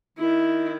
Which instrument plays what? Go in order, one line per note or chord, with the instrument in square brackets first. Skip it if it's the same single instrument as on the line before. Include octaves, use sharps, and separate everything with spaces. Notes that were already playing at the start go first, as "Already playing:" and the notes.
[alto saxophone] D#3 [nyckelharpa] E4